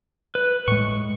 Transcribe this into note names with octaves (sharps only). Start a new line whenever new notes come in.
B4
A2 G#3 C#6